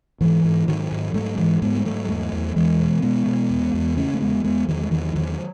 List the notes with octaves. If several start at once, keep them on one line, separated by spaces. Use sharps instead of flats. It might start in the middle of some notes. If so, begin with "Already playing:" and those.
G#2 E3
G#2
G#2 D#3 F#3
G#2
G#2 F#3 A3
G#2 E3 G#3
G#2 G#3 B3
G#3
G#2 F#3 A3
E2 F#3 A3
E2
E2 E3 G#3
B2
B2 G#3 B3
B2
E2
E2
C#3 A3 C#4
A3
E2 G#3 B3
E2 G#3 B3
E2 D#3 F#3
G#3
E2 D#3 F#3
E2 D#3 F#3